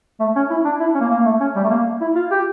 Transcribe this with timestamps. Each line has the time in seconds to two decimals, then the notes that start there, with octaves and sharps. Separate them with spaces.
0.20 A3
0.36 C#4
0.50 E4
0.65 D4
0.80 E4
0.95 C#4
1.00 A#3
1.11 A#3
1.25 A3
1.40 C#4
1.56 G3
1.63 A3
1.70 A#3
2.01 E4
2.15 F4
2.31 G4